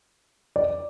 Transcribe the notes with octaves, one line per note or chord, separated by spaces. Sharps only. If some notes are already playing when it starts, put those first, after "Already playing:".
D5